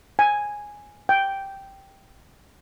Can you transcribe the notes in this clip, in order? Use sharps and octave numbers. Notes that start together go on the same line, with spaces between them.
G#5
G5